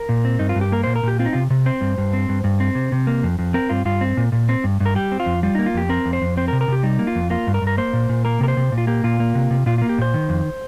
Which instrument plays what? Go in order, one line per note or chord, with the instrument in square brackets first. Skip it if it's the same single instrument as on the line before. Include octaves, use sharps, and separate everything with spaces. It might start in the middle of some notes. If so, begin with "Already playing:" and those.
Already playing: [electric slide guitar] A#4
A#2
C4
G2 D#4
F4
G2
G4
A#3 A#4
A#2 C5
A#4
A#2 G4
C4 F4
D#4
C3 F4
C3
C4 C5
G2
G2
C4
G2
G2
C4
C3
C3
A#3
F2
F2
C4 A#4
G2 F4
G2 F4
C4
A#2
A#2
C4
G2
G2
A#4
G3 G4
C4
F4
F2
G3 F4
A#3 D#4
F4
F2 G4
C4 A#4
F2
C5
F2
C4 C5
A#4
C3
A#4
C3 G4
G3 D#4
A#3
F4
F2
A#3 F4
G2
A#4
G2
A#4
A#3 C5
A#2
A#2
A#3 A#4
C3 A#4
C5
C3
A#2
F4
A#3 G4
A#2 F4
A#3
C3
C3
A#2 F4
A#3 F4
G4
A#2 C5
D#3
F2